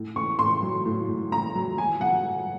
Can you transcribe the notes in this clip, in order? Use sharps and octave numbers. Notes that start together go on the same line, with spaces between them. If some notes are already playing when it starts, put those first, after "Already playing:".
Already playing: A2
A2 C#6
A2 C6
F#3
A2
A2
A2 A#5
F#3
F#3 G#5
F#3 F#5
F#3